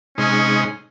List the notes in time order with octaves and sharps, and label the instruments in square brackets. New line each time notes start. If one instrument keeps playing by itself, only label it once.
[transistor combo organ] C3 G#3 D#4 [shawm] C#4